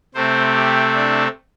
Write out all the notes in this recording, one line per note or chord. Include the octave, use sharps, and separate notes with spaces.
C3 A3 C4 C5
G4
D4